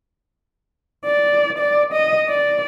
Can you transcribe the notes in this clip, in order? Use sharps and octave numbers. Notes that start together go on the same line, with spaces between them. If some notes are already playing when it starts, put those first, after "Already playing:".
D5
D5
D#5
D5